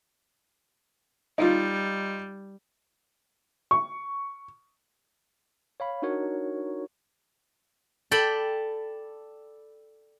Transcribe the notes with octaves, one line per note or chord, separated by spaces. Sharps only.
G3 D#4 F4
C#6
C#5 F5 B5
D4 D#4 F#4 A#4 C#5
A4 D5 G5 B5